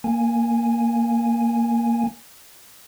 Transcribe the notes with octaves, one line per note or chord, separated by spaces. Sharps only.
A#3 G#5